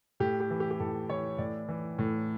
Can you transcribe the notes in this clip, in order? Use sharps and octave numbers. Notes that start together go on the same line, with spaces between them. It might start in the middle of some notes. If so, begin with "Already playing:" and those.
A2 G4
G4
E3
G4
G4
A2 A4
E3 C#5
A2 D5
E3
A2